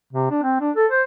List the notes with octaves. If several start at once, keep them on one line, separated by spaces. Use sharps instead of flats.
C3
D4
C4
D4
A4
C5